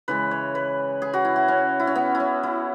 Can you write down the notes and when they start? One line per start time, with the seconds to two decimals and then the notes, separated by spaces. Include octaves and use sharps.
0.08 C#3 E3 G#3 B4
0.31 C#5
0.55 B4
1.02 G#4
1.14 F#4
1.25 E4
1.36 F#4
1.48 C#4
1.80 E4
1.87 C#4
1.95 B3
2.15 E4
2.20 C#4
2.43 E4